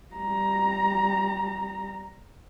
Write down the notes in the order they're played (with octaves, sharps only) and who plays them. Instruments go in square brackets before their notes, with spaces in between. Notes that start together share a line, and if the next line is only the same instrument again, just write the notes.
[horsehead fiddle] G3 A#5